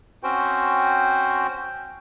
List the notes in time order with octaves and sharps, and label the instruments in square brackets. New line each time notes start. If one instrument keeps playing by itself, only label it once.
[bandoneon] C4 C#4 F#4 C5 G5